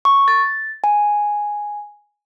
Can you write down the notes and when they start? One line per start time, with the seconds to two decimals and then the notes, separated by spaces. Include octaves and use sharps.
0.05 C#6
0.28 A6
0.84 G#5